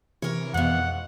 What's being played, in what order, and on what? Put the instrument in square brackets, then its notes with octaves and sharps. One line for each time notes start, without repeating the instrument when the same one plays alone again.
[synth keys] C3 [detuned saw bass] E3 [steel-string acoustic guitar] A#4 C#5
[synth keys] F2 F5 [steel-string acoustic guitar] G#2 B2 [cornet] F#5